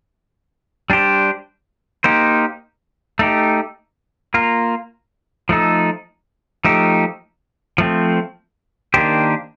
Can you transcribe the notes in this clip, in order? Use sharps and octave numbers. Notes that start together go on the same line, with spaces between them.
G3 D4 G4 C5
A#3 D#4 G4 C5
A3 D#4 G4
A#3 F4 A#4
F3 A3 D#4 A4
F3 A3 D#4 G4
F3 A3 C4
D#3 A#3 D4 G4 C5